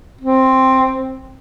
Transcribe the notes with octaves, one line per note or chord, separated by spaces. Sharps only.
C4